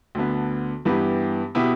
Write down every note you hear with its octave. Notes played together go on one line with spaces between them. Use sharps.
D2 D3 B3
G2 E3 B3 G4
B2 B3 E4 G4